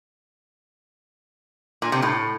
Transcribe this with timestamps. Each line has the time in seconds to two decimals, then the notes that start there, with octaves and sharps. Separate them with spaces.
1.82 A#2
1.92 C3
2.02 A2